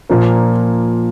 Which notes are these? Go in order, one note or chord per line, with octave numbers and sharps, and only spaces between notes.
A#2 F3 A#3